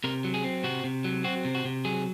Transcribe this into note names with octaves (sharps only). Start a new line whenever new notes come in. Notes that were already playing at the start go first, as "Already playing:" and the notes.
C3 A#4
F#3
G#4
C4
C3 F#4
C3
F#3
C4 F#4
C3
F#4
C3
F#3 G#4